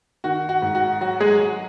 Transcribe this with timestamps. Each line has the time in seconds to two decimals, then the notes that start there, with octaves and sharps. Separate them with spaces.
0.24 D#3 F#4
0.49 F#4
0.62 G#2
0.75 F#4
1.01 F#3 F#4
1.20 G#3 G#4
1.40 F#3